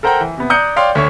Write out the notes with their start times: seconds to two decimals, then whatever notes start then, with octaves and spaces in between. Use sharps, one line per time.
0.03 A4 A#4 C5 F#5 G5 A#5
0.21 E3
0.38 C3 B3
0.50 D5 A#5 D#6 F#6 G6 C#7
0.76 C#5 D5 F5 G5 C6
0.95 D2 C#5 E5 C#6